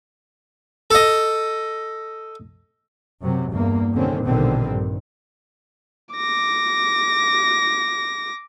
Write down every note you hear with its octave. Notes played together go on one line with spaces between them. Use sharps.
A4 D#5
F#2 C3 F#3
E2 G2 A#3
C2 D3 D#3 C4 C#4
A#1 B2 D3 D#3 G3 C4
G2
D6 A#6